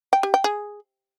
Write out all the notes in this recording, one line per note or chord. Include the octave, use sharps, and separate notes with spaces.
G5
G4
G5
G#4